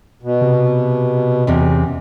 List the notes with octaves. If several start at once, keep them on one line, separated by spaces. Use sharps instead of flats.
B2
C3
E2 C3 C#4